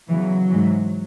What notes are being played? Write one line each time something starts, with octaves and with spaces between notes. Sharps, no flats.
E2 C#3 E3 F#3
G#2 E3